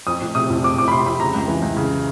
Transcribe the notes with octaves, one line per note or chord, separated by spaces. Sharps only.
F2 D#6
F1
C3 D#6
F1
F2 D6
F1 D6
B5
C3 C6
F1 B5
C#3 A#5
C#2
E3
C#2
C#3